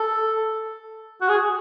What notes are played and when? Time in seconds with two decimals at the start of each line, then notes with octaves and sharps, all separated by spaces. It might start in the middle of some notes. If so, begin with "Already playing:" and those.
Already playing: A4
1.21 F#4
1.29 G#4